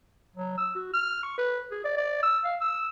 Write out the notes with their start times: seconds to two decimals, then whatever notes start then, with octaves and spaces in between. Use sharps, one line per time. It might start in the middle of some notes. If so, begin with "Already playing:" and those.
0.36 F#3
0.58 E6
0.75 F#4
0.93 F6
1.23 C#6
1.38 B4
1.71 G#4
1.84 D5
1.97 D5
2.23 E6
2.45 F5
2.61 E6